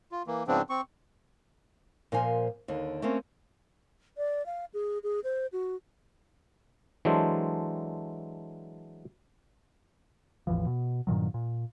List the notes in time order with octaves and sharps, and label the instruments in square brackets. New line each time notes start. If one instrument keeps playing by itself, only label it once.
[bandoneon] F4
E3 A#3
G#2 C#3 F3 B3 C4 D4
C4 C#6
[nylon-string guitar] A#2 F3 A#4 C5 G#5
D#2 D3
A3 A#3 C4 C#4
[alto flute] D5
F5
G#4
G#4
C5
F#4
[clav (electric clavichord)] E3 F#3 G#3 D4 A4 C5
[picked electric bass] A1 E2 E3 F3
B2
G2 A#2 D#3 F#3
A#2